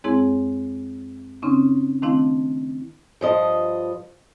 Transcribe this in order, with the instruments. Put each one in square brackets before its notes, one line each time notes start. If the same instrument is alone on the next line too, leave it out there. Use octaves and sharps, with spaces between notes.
[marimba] F#2 G#3 C4 E4 G#4 C#5
C#3 C4 C#4 D#4
D#3 A3 C4 D4 E4 F5
[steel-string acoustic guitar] G2 F3 D#5